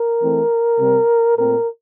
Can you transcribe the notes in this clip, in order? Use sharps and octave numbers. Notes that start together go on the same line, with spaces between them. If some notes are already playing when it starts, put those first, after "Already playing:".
Already playing: A#4
E3 A3 C4
C3 G3 C4
A#2 A3 C4 A#4